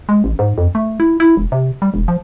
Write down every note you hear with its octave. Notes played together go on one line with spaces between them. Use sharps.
G#3
A1
G#2
F2
A3
E4
E4
E1
C3
G3
E1
F3